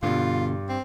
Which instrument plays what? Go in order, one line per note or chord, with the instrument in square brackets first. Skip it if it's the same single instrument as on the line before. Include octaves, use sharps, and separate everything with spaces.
[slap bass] G2 [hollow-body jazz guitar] B2 D3 [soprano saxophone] F4
[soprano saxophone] C4